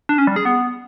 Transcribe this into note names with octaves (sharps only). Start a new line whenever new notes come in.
D4
C#4
G3
G#4
B3